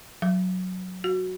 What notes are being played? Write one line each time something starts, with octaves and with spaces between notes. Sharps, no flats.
F#3
F#4